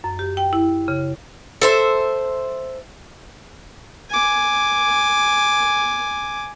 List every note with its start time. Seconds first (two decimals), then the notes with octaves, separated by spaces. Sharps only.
0.04 F#2
0.19 G4
0.37 G5
0.53 E4
0.88 C#3
1.62 A4 C5 E5
4.10 G#5 D6